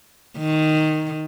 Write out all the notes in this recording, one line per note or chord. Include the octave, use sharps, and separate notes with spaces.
D#3